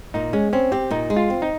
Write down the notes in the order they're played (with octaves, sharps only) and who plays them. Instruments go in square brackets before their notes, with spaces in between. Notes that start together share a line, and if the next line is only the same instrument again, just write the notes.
[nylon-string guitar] A#2 [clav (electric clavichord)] D#4
[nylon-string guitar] G#3 [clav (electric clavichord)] C#4
[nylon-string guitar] C4 [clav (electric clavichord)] C#4
[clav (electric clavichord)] C4 [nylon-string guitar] G4
[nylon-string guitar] A#2 [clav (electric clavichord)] D#4
[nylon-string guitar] G#3
[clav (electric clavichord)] F4
[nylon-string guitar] C4
[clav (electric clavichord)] D#4